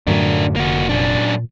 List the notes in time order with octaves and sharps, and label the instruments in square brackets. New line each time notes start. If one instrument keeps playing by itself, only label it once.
[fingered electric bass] F#2 A2 F#3 [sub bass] D3 [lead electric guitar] D4 A#4
[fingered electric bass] F1 [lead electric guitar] A#3 F#4
[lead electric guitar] F#2 D4 [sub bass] A#2